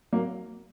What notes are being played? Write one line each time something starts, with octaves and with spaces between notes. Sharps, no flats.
F#3 A#3